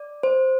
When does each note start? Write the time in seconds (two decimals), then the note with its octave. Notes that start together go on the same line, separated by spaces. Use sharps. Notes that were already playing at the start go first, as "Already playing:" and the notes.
Already playing: D5
0.23 C5